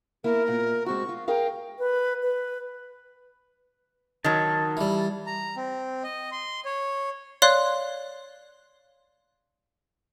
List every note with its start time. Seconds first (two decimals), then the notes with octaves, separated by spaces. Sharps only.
0.24 A#3 E4 A#4
0.48 A#2
0.86 G#3 C4 F#4 C#6
1.09 F4
1.28 G#4 A#4 F5 G5
1.79 B4
2.23 B4
4.24 D#3 F#3 A5
4.77 E3 G3
5.27 A#5
5.56 C4
6.03 D#5
6.32 C6
6.65 C#5
7.42 C#5 D5 F5 C6 F#6